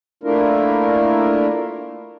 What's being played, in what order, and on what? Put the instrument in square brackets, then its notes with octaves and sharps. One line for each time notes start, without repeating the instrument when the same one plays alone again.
[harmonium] A3 A#3 D4 E4 F4 A#4